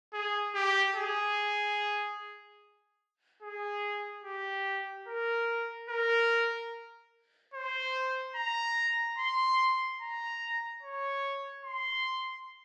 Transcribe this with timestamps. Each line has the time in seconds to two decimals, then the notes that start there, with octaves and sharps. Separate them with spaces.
0.13 G#4
0.54 G4
0.95 G#4
3.42 G#4
4.24 G4
5.08 A#4
5.89 A#4
7.54 C5
8.35 A#5
9.18 C6
10.01 A#5
10.83 C#5
11.65 C6